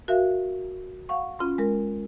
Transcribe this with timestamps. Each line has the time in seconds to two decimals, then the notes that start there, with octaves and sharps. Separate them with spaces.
0.08 F#4 A#4 E5 F5
1.09 F5 F#5 C#6
1.39 C#4 F4 B5 C6
1.58 G#3 A#4